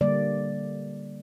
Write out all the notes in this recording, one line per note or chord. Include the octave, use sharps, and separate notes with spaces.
D3 G3 A#3 D5